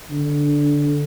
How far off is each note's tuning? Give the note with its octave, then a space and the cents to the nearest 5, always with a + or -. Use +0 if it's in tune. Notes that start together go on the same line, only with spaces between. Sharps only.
D3 -10